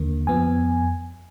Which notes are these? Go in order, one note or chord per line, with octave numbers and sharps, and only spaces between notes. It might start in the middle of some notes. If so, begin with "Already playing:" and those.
Already playing: D#2 D3 A#3
F2 F3 B3 G#5